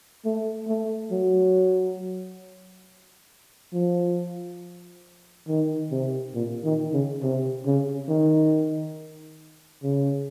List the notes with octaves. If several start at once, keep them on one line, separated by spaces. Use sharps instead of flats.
A3
A3
F#3
F3
D#3
C3
A#2
D#3
C#3
C3
C#3
D#3
C#3